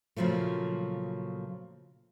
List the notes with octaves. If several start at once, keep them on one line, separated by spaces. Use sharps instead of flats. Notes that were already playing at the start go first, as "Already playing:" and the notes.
A#2 C#3 F3 F#3 A3